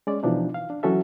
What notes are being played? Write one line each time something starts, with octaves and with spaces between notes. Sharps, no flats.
G#3 C#4 D5
B2 E3 F3 D4 D#4
F5
D4
E3 F#3 C#4 F#4 A4 E5